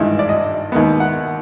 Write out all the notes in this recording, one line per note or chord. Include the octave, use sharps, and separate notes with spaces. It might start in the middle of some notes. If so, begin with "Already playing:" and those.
Already playing: G#1 G2 E3 G#3 E5
D5
D#5
D#2 D#3 G#3 B3
F#5